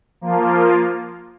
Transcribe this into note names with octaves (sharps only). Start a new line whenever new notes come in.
F3 A#3 F4